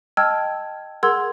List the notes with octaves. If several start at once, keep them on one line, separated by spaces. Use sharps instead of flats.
D#5 G5 A5 E6 F6 G#6
G#4 A#4 F#5 C6 E6 G#6